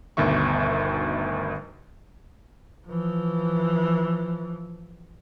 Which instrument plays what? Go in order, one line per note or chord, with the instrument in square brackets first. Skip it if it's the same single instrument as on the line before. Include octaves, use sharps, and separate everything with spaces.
[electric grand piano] G1 D2 B2 D#3 E5 C#6
[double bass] E3 F3